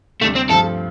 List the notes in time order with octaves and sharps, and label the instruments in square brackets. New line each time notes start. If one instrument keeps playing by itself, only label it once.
[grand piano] D2 C3 G3 D4 [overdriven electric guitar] A3
[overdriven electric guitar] C4
[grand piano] G2 F3 A3 C4 F4 [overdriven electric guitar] A4